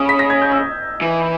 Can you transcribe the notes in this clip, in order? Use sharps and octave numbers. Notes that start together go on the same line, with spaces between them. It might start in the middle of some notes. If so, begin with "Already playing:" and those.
Already playing: C#3 D#6
B6
A#6
G#6
G6
E6
E3